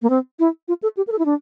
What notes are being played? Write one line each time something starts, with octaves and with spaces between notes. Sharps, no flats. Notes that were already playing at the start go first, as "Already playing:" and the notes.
A#3
C4
E4
F4
A4
G4
A#4
A4
E4
D4